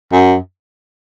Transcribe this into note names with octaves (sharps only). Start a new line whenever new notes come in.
F#2